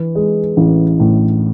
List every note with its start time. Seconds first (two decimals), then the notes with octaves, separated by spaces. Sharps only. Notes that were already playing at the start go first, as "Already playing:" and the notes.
Already playing: E3
0.15 G#3
0.57 A1
1.00 A2